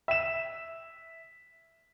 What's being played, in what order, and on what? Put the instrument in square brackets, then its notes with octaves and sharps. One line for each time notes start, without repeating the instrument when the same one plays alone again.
[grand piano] E5 E7